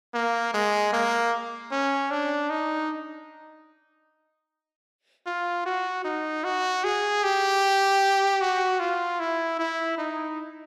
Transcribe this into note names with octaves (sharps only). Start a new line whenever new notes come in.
A#3
G#3
A#3
C#4
D4
D#4
F4
F#4
D#4
F#4
G#4
G4
F#4
F4
E4
E4
D#4